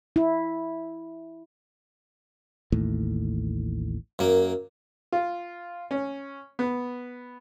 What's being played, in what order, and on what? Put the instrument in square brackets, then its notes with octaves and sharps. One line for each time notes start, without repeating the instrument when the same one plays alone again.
[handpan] E4
[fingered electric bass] A1 D#2 A2
[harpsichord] F#2 A#3
[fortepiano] F4
C#4
B3